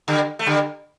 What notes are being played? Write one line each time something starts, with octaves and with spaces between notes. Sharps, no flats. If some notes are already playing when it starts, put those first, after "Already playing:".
D3 G3
A3
D3 G3